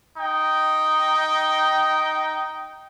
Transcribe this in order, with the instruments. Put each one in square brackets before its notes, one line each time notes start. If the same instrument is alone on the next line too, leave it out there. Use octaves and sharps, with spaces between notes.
[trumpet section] D#4 G5